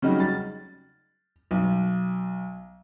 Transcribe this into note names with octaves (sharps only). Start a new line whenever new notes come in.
C#3 F#3 G3 C#4 D#4 F#4
A6
B1